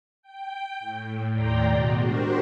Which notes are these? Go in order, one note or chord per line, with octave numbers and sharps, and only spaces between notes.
G5
A2
D#2 A2 D5 G5 A#5 C6
B2 G#3 F#4
D4 F#4 G4 A#4 C5